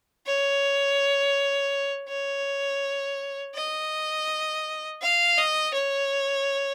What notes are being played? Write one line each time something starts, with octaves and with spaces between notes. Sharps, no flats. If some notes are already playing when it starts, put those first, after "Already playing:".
C#5
C#5
D#5
F5
D#5
C#5